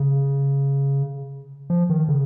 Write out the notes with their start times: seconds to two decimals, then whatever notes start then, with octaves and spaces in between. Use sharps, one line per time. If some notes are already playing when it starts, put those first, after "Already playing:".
Already playing: C#3
1.70 F3
1.90 D#3
2.08 C#3